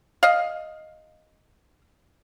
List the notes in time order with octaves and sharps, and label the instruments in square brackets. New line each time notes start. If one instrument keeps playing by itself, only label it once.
[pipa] D#5 F5